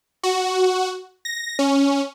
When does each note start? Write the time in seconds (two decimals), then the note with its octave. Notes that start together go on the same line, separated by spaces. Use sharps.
0.23 F#4
1.25 A#6
1.59 C#4